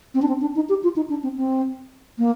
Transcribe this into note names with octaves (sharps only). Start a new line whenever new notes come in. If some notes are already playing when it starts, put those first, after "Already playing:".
C4
D4
C4
D4
D#4
G4
F4
D#4
D4
C4
C4
A#3